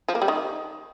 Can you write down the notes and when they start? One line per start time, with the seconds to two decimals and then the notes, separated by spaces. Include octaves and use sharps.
0.08 F3
0.15 A#3
0.22 G3
0.28 D#3